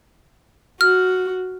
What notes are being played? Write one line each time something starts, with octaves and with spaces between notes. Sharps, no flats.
F#4 F6